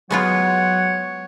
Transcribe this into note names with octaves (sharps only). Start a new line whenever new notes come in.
F#3 G#3 B3 F4 C#5 F#5